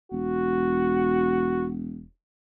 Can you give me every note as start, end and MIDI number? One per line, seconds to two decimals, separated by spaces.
0.12 2.06 28
0.12 1.69 66